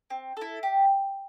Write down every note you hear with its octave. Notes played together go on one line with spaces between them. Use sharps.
C4
E4 A4
G4